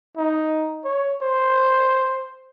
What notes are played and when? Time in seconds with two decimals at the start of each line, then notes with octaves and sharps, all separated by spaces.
0.17 D#4
0.85 C#5
1.22 C5